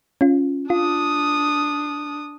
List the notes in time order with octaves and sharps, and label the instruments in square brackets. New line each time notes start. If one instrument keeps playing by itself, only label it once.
[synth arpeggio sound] C#4 F4
[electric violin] D4 D#6 [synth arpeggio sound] F4